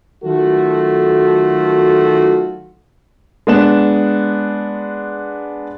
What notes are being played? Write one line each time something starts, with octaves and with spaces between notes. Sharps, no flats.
D#3 F#3 A3 F4 F#4 A4
G#3 B3 D4 E7